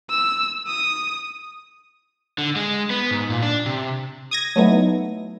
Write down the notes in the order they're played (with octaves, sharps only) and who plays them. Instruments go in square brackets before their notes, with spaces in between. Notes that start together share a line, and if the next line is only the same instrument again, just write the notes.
[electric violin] E6
D#6
[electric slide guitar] D3
G#3
B3
G#2
A#2
D4
C3
[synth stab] D#6 G#6 A#6
F#3 A3 B3 D#4 E4